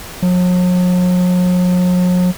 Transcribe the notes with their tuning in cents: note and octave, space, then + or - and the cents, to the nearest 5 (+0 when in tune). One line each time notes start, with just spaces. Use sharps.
F#3 -45